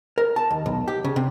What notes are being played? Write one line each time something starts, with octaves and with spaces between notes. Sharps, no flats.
A#4
A5
D#2
B1
G4
C#3
C3